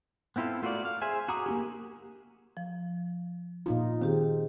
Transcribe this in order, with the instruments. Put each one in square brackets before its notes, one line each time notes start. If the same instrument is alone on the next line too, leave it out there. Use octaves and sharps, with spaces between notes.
[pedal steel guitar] B3 C4 E4 F4 A4
A3 F4 F#4 A#4 D5
F5
G#4 C5 E5 G#5
F#4 G#4 A#5 D6 D#6
A#3 D#4 G4
[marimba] F3
[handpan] A#2 D#4 F4
[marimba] D#3 G4 G#4 [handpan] C4